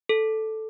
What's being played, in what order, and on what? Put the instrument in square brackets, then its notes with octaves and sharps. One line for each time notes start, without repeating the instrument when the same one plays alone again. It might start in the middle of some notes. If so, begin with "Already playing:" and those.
[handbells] A4